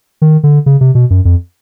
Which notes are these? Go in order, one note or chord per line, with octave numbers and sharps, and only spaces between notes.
D#3
D3
C#3
C3
B2
F#2
F2